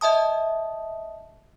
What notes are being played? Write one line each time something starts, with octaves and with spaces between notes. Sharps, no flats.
D#5 E5 A5 D#6